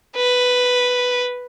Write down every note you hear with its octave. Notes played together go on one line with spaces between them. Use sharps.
B4